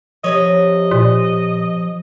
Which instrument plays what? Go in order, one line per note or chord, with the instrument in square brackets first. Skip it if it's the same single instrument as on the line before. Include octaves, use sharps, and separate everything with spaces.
[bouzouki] C3 G#3 C#5 [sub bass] F3 [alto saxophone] D#5
[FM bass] A#2